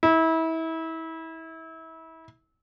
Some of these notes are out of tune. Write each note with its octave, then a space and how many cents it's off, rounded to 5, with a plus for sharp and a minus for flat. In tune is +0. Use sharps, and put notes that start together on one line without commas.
E4 -30